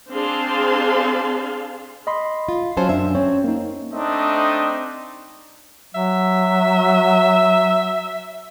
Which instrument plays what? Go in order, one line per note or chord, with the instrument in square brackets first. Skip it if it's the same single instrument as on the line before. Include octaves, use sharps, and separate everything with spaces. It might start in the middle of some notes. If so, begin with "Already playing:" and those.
[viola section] C4 D4 G#4 F5 A5 C6
[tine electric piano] D#5 B5 C6
[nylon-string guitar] F4
[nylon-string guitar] F#3 C#4 C5 [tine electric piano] F5 G#5 A5
[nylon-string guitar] F#2 E5 [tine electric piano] D4
[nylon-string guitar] C4 [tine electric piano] C#4 C#5
[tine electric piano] A#3 D#4
[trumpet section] A3 C4 D4 D#4 D#5
[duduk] F#3 [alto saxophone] E5